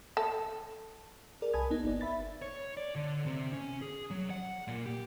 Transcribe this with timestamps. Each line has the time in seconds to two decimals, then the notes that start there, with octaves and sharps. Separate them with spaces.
0.17 A4
1.42 G#4 A#4 D5
1.53 C2 G#5 A5 B5 D#6 G#6
1.70 B3 D#4
1.84 G1 B3 D#4 D5
2.01 E5 B5 A6
2.42 C#5
2.77 D5
2.95 D3
3.26 C3
3.53 C#4
3.82 G#4
4.10 F#3
4.30 F#5
4.68 A#2
4.86 G4